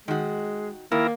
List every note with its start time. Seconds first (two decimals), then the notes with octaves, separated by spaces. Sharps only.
0.08 D#3 G#3 F#4
0.92 D#3 A#3 E4 A#4